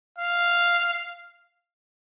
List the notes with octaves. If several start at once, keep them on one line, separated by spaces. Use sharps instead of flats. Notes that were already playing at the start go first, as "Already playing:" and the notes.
F5